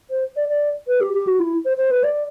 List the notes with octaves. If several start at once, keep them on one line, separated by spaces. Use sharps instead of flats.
C5
D5
D5
B4
G4
G4
F#4
E4
C5
C5
B4
D5